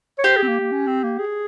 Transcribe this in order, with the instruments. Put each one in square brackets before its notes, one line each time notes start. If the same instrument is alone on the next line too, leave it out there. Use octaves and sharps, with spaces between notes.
[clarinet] C#5
[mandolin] G4 [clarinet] C5
[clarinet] G#4
C4
A#3
A#3
C#4
C4
A#3
G#4